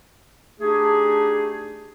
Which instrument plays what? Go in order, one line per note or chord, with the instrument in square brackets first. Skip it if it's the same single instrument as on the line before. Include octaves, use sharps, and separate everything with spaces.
[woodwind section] A3 D4 D#4 G4 G#4